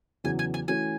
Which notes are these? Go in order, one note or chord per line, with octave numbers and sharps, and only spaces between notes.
E2 C#3 F#3 B3 G#5
G#5
G#5
E3 A3 C#4 F#4 G#5